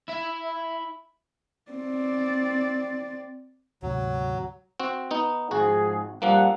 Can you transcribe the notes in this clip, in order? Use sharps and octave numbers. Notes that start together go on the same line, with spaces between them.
E4 E5
C4 D5
D2 G#2 C3 F#3
C4 F#4
B3 D#4
G#1 G#2 F3 F#4 G#4
A#1 F3 G3 A#3 F#5